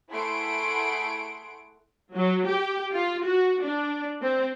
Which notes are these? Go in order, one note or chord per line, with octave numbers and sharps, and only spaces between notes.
A3 E4 G#4 F#5 C6 D7
F#3
G4
F4
F#4
D4
C4